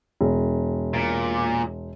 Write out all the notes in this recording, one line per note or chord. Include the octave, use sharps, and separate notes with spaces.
E1
A#2